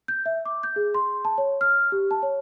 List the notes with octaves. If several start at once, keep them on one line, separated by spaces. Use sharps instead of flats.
G6
E5
D6
G6
G#4
C6
A5
C#5
F6
G4
A5
C#5